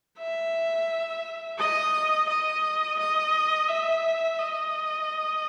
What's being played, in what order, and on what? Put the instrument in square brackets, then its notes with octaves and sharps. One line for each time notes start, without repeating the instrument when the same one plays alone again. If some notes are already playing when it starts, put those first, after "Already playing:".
[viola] E5
D#5
D#5
D#5
E5
D#5